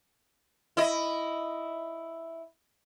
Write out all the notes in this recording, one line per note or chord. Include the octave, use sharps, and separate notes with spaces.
E4 D#5